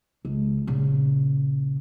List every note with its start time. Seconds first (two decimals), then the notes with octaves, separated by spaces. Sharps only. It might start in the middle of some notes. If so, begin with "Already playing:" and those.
0.25 C#2
0.67 A#1 C#3